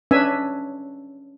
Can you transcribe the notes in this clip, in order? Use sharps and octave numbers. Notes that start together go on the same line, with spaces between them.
C#4 D4 B4 E5 G#5 E6